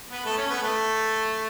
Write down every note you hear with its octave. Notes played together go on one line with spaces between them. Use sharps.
B3 B4
A3 A4
C#4 C#5
A4
B3 B4
A3 A4